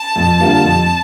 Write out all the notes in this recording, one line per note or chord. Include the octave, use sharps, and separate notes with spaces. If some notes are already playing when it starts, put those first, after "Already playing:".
Already playing: A5
F2
D3 G3 A#3 F4
F2